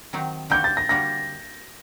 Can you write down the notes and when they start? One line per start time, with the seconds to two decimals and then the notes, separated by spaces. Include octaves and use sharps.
0.13 D#3 F#3 C4 D#4
0.50 D3 G3 A#3 F#4 G6
0.64 A6
0.77 A#6
0.89 D3 G3 A#3 F#4 A#6